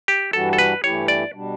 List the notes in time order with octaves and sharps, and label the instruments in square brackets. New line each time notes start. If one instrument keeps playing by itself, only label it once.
[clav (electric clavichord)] G4
[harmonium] G2 E3 G3 D4 F#4 [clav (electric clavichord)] A4
[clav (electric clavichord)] A4
B4
[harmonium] G2 E3 A3 E4 G4 [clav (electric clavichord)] C#5
[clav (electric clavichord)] D5
[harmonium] B2 G3 D4